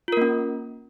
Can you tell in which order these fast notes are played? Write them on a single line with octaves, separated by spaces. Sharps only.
F4 A#4 A#3 C#4